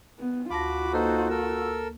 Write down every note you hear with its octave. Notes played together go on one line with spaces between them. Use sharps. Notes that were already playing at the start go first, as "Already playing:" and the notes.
B3
D2 F4 F#4 A5 B5 D6 A#6
A#3 D#4 A4 B4 C5
A4 A#4 E6